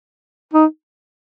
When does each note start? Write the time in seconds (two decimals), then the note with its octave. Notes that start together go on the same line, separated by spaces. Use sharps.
0.53 D#4